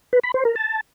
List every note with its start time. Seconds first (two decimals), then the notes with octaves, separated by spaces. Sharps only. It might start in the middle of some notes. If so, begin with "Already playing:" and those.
0.13 B4
0.24 B5
0.34 C5
0.45 A#4
0.56 A5